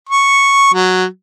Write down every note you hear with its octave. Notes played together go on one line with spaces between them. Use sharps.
C#6
F#3